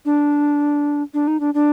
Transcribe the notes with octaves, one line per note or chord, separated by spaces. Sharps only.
D4
D4
D#4
D4
D4